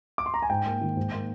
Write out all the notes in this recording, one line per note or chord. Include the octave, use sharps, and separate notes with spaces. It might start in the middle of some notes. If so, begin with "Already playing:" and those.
D6
C6
A#5
G#5
G#2 G5
A#3
D#3
G#2
A#3